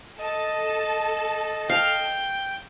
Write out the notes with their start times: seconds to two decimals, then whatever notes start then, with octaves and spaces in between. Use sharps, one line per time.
0.19 A4 D#5 A5
1.70 F5 G5